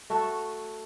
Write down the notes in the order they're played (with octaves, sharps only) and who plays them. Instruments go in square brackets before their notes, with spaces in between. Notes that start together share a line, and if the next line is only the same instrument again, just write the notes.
[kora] A3 F#4 A4